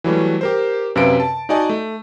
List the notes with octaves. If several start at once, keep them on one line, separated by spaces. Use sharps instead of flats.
E3 F#3 G3 A3
G4 A#4 C5
F#2 C3 B4 F5 D7
A5
D#4 F#4 D5 D#5 G#5 A5
A3